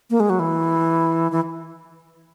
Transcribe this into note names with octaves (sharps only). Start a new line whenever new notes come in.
A#3
G#3
F#3
E3
E3